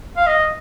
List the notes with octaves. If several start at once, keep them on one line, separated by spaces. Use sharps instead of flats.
F5
D#5